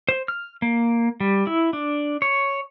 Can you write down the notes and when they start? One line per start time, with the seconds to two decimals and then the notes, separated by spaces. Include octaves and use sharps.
0.09 C5
0.28 F6
0.62 A#3
1.20 G3
1.47 E4
1.73 D4
2.22 C#5